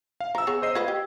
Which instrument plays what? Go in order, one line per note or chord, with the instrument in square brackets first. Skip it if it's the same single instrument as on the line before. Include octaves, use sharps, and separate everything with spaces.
[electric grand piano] F5
[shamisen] F3 [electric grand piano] A#5 E6
[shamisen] B3 G#4 C#5
[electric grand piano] C5 D#5 C7
[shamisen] F4 B4 D#5 [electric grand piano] G#6
[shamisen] G4